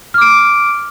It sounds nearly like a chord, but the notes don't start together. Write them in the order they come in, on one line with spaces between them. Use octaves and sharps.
F6 D6 D7